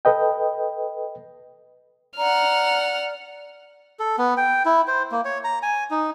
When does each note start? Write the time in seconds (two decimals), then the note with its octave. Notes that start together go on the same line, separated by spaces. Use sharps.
0.05 A4 B4 D#5 G5
2.18 D5 F#5 A#5 F6
3.99 A4
4.18 B3
4.37 G5
4.65 E4
4.88 C5
5.11 A#3
5.25 C#5
5.44 A#5
5.63 G#5
5.91 D#4